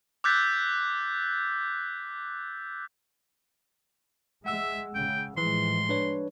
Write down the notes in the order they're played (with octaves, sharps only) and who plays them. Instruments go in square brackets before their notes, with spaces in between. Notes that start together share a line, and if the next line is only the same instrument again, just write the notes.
[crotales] D6 E6 F#6 G6 A6 B6
[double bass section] G#3 [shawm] E5 [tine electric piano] F#5 E6
[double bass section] C#3 [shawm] G5
[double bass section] A2 F3 G#3 [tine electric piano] E3 [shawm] C6
[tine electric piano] D4 B4 C#5